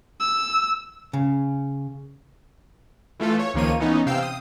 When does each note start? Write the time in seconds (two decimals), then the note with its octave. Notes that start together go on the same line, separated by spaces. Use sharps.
0.20 E6
1.13 C#3
3.20 E3 A3 F4 A4
3.39 C#5
3.54 C#2 D#3 F3 A#3 C#5 D#7
3.80 E3 B3 C#4 D#4
4.06 C3 F5 G5 E6 C7
4.23 D#6